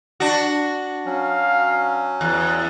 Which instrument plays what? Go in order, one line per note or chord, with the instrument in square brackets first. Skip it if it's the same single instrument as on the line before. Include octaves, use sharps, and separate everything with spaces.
[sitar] D4 F#4
[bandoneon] F#3 C#4 [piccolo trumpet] F5
[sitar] E2 [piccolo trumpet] F#6